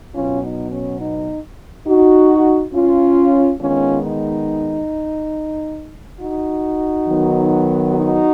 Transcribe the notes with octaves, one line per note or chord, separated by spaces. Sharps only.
B2 F#3 B3 C#4 F4
D#4
C#4
D#4
D#4 F#4
C#4 F4
D#3 G#3 B3 C#4 F4
D#4
D#4 F#4
D#3 F#3 B3
D#4 F#4